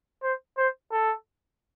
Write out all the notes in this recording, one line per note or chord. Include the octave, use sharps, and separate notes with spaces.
C5
C5
A4